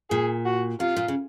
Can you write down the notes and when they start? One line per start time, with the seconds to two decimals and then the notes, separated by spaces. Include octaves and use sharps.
0.10 A#2 G#4
0.45 F#4
0.80 C3 F4
0.96 A#2
1.08 C#3